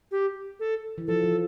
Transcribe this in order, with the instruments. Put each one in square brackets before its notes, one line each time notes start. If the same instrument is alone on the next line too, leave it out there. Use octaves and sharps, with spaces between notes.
[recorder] G4
A4
[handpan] E3
[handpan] F3 [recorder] A4
[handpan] F3